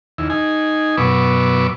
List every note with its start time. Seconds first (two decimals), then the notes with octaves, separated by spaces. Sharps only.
0.18 D#2 E4
0.30 D#4 G#5
0.97 F#2 B2 B4 C#6 D6 E6